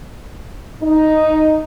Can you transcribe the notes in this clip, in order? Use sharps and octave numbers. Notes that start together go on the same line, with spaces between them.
D#4